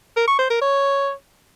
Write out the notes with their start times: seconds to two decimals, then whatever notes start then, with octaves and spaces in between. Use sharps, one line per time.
0.16 A#4
0.28 C#6
0.39 C5
0.50 A#4
0.61 C#5